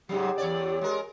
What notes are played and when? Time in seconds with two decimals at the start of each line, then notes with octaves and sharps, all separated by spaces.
0.09 G#2 C#3 F#3 G4
0.38 E2 C#5 D5
0.81 G#3 A#4